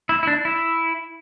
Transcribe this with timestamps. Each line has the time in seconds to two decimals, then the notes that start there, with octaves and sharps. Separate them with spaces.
0.09 E4
0.23 E4
0.27 D4
0.45 E4